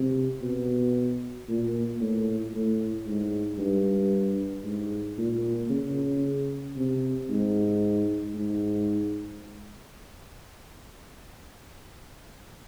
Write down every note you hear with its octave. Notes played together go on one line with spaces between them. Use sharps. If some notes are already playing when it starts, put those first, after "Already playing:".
Already playing: C3
B2
A#2
A2
A2
G#2
G2
G#2
A#2
C#3
C3
G#2
G#2